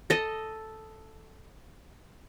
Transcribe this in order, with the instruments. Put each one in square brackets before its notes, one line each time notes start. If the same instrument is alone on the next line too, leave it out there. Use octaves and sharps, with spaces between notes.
[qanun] A4 D#5